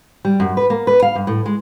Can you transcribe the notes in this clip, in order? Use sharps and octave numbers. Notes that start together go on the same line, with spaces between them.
G3
F#2
B4
A#3
B4
F5
G2
A2
G#3